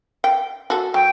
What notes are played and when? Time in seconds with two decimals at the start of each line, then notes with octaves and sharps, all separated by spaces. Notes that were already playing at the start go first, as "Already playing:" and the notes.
0.24 G5
0.70 F#4 A4
0.94 F#3 G5